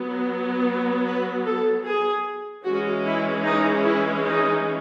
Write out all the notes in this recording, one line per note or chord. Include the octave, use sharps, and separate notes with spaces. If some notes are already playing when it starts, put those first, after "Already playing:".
Already playing: F#3 B3
B4
A4
G#4
E3 G#3 C#4 F#4
E4
D#4
E4
D#4